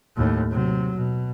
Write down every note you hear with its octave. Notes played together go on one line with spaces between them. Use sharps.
D#2 A2
C3 F#3
B2